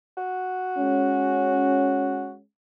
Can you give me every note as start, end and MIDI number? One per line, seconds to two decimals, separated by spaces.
0.17 2.33 66
0.79 2.43 56
0.79 2.43 61